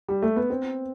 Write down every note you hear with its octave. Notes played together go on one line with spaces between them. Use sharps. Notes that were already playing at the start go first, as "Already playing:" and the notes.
G3
A3
B3
C4